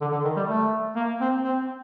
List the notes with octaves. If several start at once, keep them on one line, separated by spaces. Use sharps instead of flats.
D3
D3
D#3
G3
A3
A#3
C4
C4